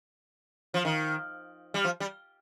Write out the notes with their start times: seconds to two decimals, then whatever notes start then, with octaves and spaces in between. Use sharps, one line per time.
0.74 F3
0.85 D#3
1.74 G3
1.85 F3
2.00 G3